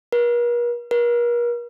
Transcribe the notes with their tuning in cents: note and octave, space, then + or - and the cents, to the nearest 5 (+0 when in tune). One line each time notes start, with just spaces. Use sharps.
A#4 +45
A#4 +40